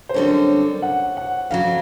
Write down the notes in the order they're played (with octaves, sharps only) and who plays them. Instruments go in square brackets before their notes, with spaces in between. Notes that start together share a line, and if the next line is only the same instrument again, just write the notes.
[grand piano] C5
[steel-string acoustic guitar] F#2 D3 G3 C4 [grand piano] C#5
[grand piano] F#5
F#5
[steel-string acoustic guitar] F2 C#3 F#3 [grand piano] F5